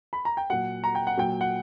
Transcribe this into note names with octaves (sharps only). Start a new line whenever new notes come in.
B5
A#5
G5
A#2 F#3 F#5
A#5
G5
F#5
A#2 F#3 G5
F#5